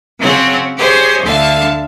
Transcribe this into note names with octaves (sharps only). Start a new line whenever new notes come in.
C#3 F#3 C4 C#5 F#5
G4 G#4 C5 C#5 D#5
D2 D3 E5 F5 A5